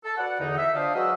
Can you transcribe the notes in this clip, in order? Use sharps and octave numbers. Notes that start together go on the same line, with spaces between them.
A4
F#4 B4 D5 F#5
E2 D3 D#4
E5
D4 F4 C5 D5 D#5 F5
F#3 G#3 F#4 B4 D#5 E6